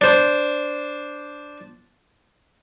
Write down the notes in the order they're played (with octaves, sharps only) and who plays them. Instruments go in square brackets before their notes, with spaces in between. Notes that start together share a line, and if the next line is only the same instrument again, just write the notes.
[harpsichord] D4 C5